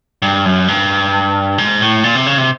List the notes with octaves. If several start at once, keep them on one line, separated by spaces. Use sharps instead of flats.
G2
F#2
G2
G#2
A2
A#2
C3
C#3
C3